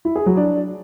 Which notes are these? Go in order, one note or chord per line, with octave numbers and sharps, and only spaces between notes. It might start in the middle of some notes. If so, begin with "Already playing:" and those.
E4
G#4
F#3
D4